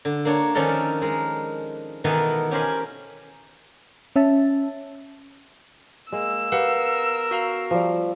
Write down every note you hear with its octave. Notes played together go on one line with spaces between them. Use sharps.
D3
A#3 D4 C#5
D#3 F3 C#4 D4 A4 A#4
G#3 A#4
B2 D#3 E3 B3 A4 A#4
C#4 G4 A#4 C5 G#5 B5
C#4 E5 A5
G#3 A#3 E6
B3 G4 A#4 F5 F#5
F#4 F5 A#5
F3 G3